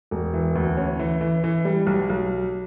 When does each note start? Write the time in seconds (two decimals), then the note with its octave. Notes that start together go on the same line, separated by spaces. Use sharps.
0.11 E1
0.34 E3
0.55 D2
0.77 C#4
0.99 E3
1.21 E3
1.44 E3
1.65 G3
1.87 B1
2.09 B1